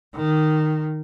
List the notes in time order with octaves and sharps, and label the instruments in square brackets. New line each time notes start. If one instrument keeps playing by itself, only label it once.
[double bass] D#3